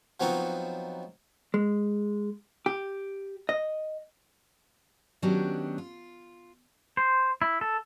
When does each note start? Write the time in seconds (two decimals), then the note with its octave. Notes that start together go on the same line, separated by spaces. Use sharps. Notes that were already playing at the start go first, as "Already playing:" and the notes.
0.20 F3 F#3 B3 C4 D#4 F#4
1.54 G#3
2.66 G4
3.49 D#5
5.22 D#3 F#3 B3 C#4 D4 G4
5.78 F4
6.97 C5
7.42 E4
7.61 A4